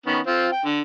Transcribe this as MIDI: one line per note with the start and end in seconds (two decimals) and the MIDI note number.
0.06 0.20 51
0.06 0.20 59
0.06 0.20 61
0.27 0.48 60
0.27 0.48 65
0.52 0.64 79
0.65 0.81 50